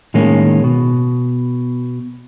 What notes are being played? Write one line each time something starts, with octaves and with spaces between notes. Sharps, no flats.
A2 D#3 G#3 A#3 C#4
B2